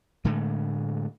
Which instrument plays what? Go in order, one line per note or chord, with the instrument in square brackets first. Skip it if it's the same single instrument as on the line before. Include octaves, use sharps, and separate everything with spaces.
[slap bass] A2 D3 G#3 A3